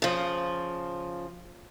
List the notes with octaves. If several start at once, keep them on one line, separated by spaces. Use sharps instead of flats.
C#3 F3